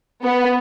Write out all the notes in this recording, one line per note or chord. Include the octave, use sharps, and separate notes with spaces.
B3